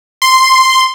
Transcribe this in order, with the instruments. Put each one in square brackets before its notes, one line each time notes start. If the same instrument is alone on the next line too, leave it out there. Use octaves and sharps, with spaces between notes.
[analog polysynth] C6